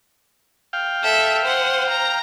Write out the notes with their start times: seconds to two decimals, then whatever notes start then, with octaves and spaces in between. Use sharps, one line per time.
0.73 F5 G5
1.03 A4 E5
1.45 C5 F#5
1.89 A#5